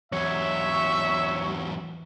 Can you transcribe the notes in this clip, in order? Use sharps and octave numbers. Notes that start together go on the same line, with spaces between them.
E2 F#3 C#5 E5